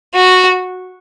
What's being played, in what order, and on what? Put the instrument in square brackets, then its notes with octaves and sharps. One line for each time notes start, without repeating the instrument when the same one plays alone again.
[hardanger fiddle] F#4